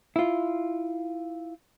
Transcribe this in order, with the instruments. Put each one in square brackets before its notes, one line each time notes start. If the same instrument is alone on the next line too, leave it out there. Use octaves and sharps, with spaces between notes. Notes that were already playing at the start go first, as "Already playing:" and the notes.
[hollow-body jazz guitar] E4 F4